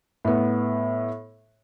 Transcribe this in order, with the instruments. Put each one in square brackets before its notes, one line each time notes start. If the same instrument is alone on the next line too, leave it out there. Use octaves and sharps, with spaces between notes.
[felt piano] A2 B3